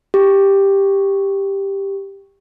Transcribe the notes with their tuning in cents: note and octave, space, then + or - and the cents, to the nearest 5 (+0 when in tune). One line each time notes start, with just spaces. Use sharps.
G4 +5